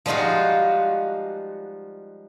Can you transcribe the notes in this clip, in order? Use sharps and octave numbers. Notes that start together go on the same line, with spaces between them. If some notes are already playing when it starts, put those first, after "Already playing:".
F3 G3 G#3 D#4 F4 F#4